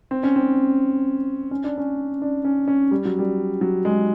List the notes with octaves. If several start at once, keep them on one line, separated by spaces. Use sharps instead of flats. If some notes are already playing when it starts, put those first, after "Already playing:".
C4
C#4
C4
C#4
D4
C#4
D4
C#4
C#4
G3
F#3
G3
F#3
G#3